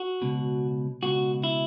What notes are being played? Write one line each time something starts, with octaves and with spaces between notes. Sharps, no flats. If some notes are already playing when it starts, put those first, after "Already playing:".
Already playing: F#4
C#2 B2
C#2 B2 F#4
E4